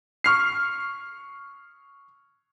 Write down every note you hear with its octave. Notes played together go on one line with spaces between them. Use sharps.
C#6 F6 C7